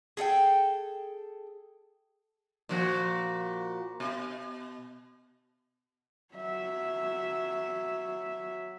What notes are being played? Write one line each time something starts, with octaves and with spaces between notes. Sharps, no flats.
G#4 A4 E5 G5
A#2 F3 F#4
B2
F#3 E5